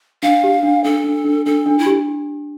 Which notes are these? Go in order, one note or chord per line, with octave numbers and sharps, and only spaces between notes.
D4 F5
G4
D4
D4 A4
D4
D4
D4 A4
D4
E4
G4